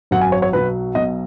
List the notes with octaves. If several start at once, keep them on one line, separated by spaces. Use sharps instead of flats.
G#1 F#2 F#3 F#5
G#5
C#5
C#5
B1 B2 F#3 B4
B1 B2 F#3 D#5